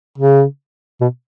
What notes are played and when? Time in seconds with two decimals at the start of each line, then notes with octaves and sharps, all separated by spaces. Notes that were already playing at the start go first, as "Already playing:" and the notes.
0.18 C#3
1.01 B2